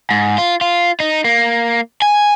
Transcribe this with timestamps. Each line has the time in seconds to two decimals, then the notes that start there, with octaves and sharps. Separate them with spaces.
0.11 G#2
0.38 F4
0.61 F4
1.00 D#4
1.24 A#3
2.02 G#5